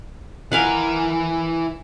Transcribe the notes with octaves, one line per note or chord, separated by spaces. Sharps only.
E3 A#4 F5 F#5 G#5